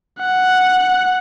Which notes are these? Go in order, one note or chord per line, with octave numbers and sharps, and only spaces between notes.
F#5